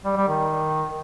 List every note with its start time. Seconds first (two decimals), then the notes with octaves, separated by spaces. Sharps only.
0.05 G3
0.17 G3
0.28 D#3